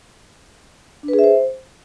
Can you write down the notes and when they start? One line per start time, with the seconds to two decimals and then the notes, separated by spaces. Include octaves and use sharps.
1.03 D4
1.08 B4
1.13 G#4
1.19 E5
1.24 C5